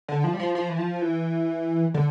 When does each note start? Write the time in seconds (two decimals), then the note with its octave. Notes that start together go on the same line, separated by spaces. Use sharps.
0.08 D3
0.24 F3
0.34 G3
0.40 F3
0.55 F3
0.69 E3
0.78 F3
1.02 E3
1.94 D3